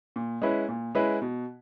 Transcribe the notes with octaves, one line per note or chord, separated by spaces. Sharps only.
A#2
G#3 C#4 E4 B4
A#2
G#3 C#4 E4 B4
B2